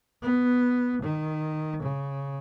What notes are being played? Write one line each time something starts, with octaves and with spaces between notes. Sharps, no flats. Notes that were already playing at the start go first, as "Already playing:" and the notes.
B3
D#3
C#3